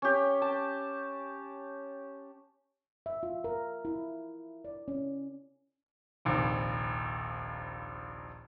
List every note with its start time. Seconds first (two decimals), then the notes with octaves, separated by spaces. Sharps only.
0.02 C#4 G4
0.42 A5
3.06 E5
3.23 F4
3.44 A#4
3.85 E4
4.65 D5
4.88 C#4
6.25 F1 A#1 D#2